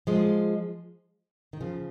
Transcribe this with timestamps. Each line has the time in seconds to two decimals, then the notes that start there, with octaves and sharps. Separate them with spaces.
0.07 F3 G#3
1.53 D#3
1.61 C#3 F3